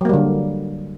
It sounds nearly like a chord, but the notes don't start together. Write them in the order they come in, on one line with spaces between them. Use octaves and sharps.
F#3 A#3 G3 D3